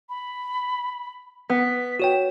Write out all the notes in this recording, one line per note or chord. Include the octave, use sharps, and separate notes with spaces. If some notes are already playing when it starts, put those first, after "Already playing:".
B5
B3 B6
F#4 C#5 G5 E7